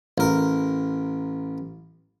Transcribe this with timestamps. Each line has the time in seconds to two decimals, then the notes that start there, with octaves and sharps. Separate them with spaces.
0.18 A1 A#4